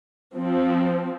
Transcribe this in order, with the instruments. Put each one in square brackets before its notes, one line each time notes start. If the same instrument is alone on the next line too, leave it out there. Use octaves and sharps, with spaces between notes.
[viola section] F3 C4